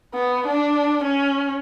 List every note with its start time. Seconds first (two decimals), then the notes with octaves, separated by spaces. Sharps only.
0.14 B3
0.47 D4
1.04 C#4